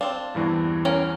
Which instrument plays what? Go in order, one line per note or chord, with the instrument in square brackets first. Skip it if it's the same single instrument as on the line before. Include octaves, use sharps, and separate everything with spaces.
[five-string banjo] C4 D4 [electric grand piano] F5
[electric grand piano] E2 G2 E3
[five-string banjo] C#4 A#4 F#5